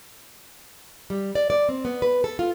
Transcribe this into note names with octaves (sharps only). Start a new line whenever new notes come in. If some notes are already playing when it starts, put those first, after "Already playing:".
G3
D5
D5
C4
B3
B4
A4
F4